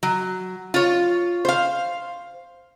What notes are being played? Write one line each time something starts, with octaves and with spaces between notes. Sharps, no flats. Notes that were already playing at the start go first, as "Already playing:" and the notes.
F#3
F4 C#5
C5 F5